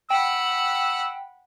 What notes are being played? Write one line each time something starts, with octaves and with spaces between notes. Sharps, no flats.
F#5 G5 B5 E6